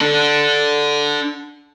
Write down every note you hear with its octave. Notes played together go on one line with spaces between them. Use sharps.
D4 A4